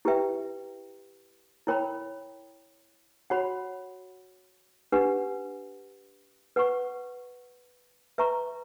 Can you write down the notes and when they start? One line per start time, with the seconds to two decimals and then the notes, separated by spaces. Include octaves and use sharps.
0.05 E4 G4 B4 E5 G5
1.67 E4 A#4 C#5 G5 B5
3.30 F#4 C#5 F#5 B5
4.92 D4 G4 B4 F#5
6.56 B4 F#5 C#6
8.18 B4 E5 A#5 C#6